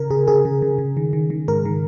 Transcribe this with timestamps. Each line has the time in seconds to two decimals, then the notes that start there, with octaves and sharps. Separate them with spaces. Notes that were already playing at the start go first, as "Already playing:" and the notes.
Already playing: C#3 A#4
0.10 C#3 G#4
0.28 C#3 G#4
0.45 C#3
0.62 C#3
0.78 C#3
0.97 D#3
1.13 D#3
1.30 D#3
1.48 G#2 A#4
1.65 D#3